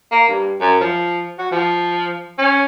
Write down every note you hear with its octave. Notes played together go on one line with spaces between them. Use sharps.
A#3
G2
F#2
F3
F#4
F3
C#4